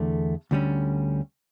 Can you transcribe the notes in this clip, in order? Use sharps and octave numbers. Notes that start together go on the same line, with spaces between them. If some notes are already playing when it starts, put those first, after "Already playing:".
Already playing: E2 D3 A3
D2 D3 G3 C#4